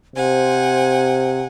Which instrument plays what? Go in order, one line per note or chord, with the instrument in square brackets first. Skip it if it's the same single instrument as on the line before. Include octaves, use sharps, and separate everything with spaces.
[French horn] C3 [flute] C5 [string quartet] F#5 G#5